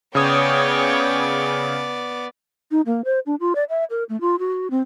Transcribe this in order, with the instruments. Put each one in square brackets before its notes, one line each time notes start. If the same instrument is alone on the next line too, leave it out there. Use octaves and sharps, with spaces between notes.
[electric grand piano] C#3 D#6 [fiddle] B3 D5 [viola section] C#5 G5
[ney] D#4
A#3
C5
D4
F4
D5
E5
A#4
A3
F4
F#4
C4